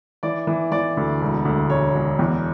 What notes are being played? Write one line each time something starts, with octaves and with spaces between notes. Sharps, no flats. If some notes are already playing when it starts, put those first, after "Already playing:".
E3 D5
E3
E3 D5
D2
E1
D2
E1 C#5
E1
E2